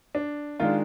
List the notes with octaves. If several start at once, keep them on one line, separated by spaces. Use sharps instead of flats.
D4
D#3 G#3 D4 F4